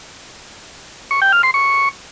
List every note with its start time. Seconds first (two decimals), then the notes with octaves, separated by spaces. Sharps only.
1.11 C#6
1.22 G5
1.32 F6
1.43 C6
1.54 C#6